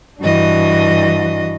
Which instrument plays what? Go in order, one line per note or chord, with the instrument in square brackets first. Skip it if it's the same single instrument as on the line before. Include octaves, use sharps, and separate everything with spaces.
[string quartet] G2 E3 D4 F#4 D#5